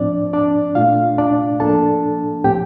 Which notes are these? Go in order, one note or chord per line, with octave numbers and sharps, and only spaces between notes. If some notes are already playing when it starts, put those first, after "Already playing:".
Already playing: A2 F3 C4 D4 D5
D4 D5
A#2 A3 D4 F4 F5
D4 D5
A2 F3 A#3 D4 A4 A5
A2 F3 C4 G4 G5